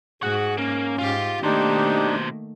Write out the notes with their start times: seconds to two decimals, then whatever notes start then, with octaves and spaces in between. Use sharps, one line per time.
0.23 G#2 F#4 G#4 F#5
0.58 A#3 C#4
0.99 G#2 F4 G4
1.43 B2 D#3 A3 A#3 D4 D#4 G4 C5